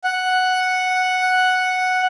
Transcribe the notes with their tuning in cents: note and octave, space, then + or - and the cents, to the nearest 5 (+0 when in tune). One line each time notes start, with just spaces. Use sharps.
F#5 +0